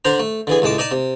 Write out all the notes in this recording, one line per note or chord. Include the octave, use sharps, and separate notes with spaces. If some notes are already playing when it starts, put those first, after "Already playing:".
D3 D4 C5 A#5
A3
D3 E3 G#4
C#2 A2 G#3 A5 D6
D#4 D5 D#5 A5
C3